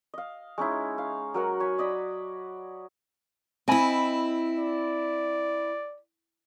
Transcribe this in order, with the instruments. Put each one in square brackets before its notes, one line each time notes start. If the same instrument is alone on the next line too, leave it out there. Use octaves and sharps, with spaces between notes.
[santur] D#5 F5
G#3 C#4 D#4 E4
F5
F#3 A#4 F#5
C#5 G#5 B5
D5 D#5 B5
[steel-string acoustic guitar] C4 E4 [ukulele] D#5 G#5 B5
[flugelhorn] D5